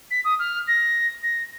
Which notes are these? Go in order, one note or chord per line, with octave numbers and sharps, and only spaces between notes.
B6
D#6
F6
A#6
A#6